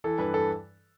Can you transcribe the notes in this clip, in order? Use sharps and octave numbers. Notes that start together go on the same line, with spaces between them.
E3 A4
G2 B4
A4